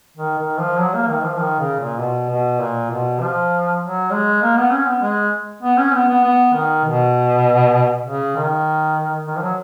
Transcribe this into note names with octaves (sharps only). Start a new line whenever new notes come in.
D#3
D#3
F3
F#3
A#3
D#3
F3
D#3
C#3
A#2
B2
B2
A#2
B2
F3
F#3
G#3
A#3
B3
C#4
B3
G#3
B3
C#4
B3
B3
B3
D#3
B2
C#3
D#3
D#3
F3
F#3